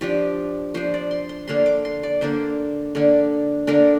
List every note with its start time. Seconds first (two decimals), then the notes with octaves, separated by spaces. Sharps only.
0.01 F3 D4 G4
0.74 F3 D4 C5
0.94 D5
1.11 C6
1.29 C6
1.48 D3 A#3 D4 C6
1.66 D6
1.85 C6
2.03 D5
2.21 D3 A#3 D4 C5
2.95 D3 A#3 D4
3.67 D3 A#3 D4 A#4